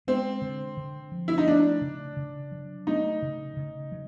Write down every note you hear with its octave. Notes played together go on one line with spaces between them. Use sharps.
G#3 C4
D3
D3
F3
E4
D#4
A3 D4
C#3
C#3
F#3
A3 D#4
C#3
C#3
F#3